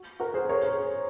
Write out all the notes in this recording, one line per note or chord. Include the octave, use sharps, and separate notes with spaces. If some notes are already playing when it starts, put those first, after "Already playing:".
Already playing: F#4
F#4 A#4
G#4 C5
A#4 C#5
G#4 C5